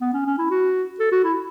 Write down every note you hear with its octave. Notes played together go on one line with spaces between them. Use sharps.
B3
C#4
C#4
E4
F#4
A4
F#4
E4